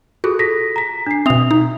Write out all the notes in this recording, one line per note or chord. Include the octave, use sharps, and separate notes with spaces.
F4 F#4 G#4 A4
A4 A#6 B6
A#5 B6
D4 C7
B2 C4 E5 D#6 F7
D#4